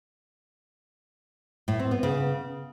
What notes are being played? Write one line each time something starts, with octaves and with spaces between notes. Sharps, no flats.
A2
C4
B3
C#3